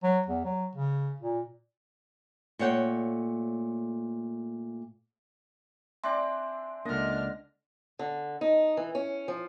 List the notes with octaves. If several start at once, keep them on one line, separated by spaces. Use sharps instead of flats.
F#3
E2
F#3
C#3
A#2
A#2 A3 C#5 F#5 G5
C4 D4 D5 E5 G#5 C6
C#2 D3 A#3 D4 D#5 F6
D3
D#4
E3
C#4
F3